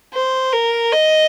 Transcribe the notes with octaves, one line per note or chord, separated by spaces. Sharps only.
C5
A#4
D#5